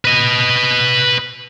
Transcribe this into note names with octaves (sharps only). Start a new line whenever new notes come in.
B4 D#5